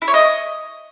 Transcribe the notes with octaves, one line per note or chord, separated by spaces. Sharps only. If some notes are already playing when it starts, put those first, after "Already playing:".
E4
C#5
D#5